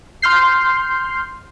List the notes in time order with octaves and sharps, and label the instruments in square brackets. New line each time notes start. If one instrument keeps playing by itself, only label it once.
[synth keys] C6 F6 G6 C7